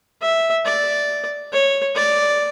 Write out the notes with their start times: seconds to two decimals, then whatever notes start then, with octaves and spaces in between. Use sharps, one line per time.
0.22 E5
0.66 D5
1.53 C#5
1.96 D5